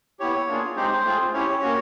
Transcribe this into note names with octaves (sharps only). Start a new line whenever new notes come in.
B3 E4 G4 C#5
A#3 D4 F4 G#4
G#3 C4 D#4 G4 C5
A3 C4 F4 G#4
C#4 E4 G4 C#5
A#3 C#4 F#4